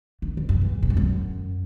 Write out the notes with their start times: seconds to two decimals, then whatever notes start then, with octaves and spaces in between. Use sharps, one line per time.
0.22 D#3
0.37 E2
0.49 F#2
0.61 E2
0.82 A2
0.90 G#2
0.97 F#2